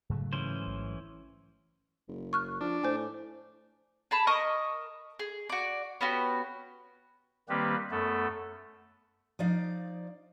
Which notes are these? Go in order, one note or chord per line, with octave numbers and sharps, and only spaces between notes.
G#2 C#3 F#3 A3
E3 C#4 C5
A1
F#1
C#6 F6 F#6
F3 D4
A2 C5 G#5
G#4 A5 B5
A#4 D#5 C#6 D#6
G#4
F#4 D5
B3 C#4 F#4 G4
D#3 G3 A#3 C4 G4 B4
F#2 A3 B3 A4
F3 D#4 D5 F5